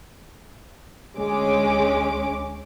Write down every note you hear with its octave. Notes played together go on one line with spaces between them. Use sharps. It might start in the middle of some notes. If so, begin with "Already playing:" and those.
D2 G#3 C#4 D6